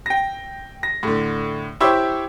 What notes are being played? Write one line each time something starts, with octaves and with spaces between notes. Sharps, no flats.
G5 A#6
A#6
A2 D3
E4 G4 C5 C#5 D6 E6